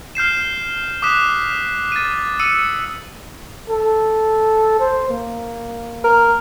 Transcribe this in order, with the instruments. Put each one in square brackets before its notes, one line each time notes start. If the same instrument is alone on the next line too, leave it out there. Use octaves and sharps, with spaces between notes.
[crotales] F6 G6 C7 E7
D6 D#6 F#6 B6 E7
A6 D#7
E6 C#7 D#7
[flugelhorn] A4
C5
A#3
[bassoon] A#4